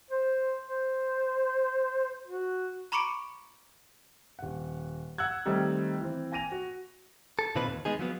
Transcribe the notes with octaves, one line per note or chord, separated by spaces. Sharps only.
C5
C5
F#4
A#5 B5 C#6 D6 C#7 D7
D#1 F#5
F#5 E6 F#6 G#6
D#3 G3 A3 C4 D#4
E3 C4
G5 G#5 A#6 D#7 F7
F#4
A4
A#2 D#3 C4 F4 B4
D#2
G#3 B3 D#4 G#4
F3 F#3 B3